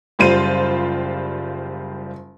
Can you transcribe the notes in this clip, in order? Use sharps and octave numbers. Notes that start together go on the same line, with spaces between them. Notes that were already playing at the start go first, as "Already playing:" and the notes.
F#1 G3 F4 C5 D#7